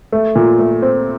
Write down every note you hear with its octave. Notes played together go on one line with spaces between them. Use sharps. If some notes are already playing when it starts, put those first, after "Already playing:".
A3
A#2
A3
C4